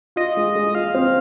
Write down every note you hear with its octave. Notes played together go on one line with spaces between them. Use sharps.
F4 D#5
G#3
G#3
F4 F5
C4